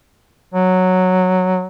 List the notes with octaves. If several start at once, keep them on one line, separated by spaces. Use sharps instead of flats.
F#3